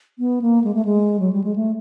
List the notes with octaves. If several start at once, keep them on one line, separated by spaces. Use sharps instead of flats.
B3
A#3
G#3
A3
G#3
F#3
G3
G#3
A3